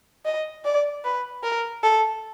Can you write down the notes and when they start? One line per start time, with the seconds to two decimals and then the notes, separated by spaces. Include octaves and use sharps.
0.25 D#5
0.65 D5
1.05 B4
1.43 A#4
1.83 A4